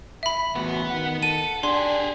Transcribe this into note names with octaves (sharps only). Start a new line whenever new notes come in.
E5 B5
E2 A2 B3 F#4 B4
D#3 F#5
A4 D#7
D4 G4 G#4 D5 C6